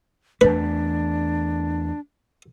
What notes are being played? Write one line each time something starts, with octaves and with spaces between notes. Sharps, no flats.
E2 A3 D4 B4